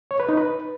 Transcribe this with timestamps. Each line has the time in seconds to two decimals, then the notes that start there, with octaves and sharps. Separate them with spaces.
0.11 C#5
0.20 B4
0.29 D#4
0.38 B4